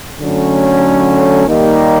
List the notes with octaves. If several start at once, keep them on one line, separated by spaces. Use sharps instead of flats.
D3 F#3 A3 C#4
D#2 D#3 G3 A#3 D#4